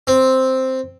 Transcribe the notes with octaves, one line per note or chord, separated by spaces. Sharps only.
C4